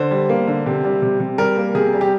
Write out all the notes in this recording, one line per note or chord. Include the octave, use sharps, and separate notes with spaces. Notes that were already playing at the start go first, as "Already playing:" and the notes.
Already playing: D3 C5
G3
A#3
D3
C3
G3
C3
C3
G3 A#4
A#3
C3 G#4
G3
G4